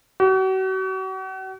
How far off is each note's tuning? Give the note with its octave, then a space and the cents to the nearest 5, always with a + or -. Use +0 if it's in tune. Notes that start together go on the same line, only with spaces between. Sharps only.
F#4 +40